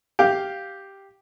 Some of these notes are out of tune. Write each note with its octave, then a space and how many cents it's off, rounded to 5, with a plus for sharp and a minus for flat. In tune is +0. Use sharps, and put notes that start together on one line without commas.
G4 +0 F5 +0